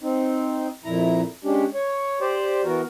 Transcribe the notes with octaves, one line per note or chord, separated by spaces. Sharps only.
C4 D#4
F2 A#2 E4 A#5
G#3 C#4 D4 G4
C#5
G4 C5 D5
E3 B3 F#4 A#4